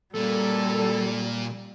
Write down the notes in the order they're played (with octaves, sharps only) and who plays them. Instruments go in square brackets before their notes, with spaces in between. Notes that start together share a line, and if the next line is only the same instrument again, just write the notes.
[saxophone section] F#2 A4 [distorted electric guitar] A#2 [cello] G3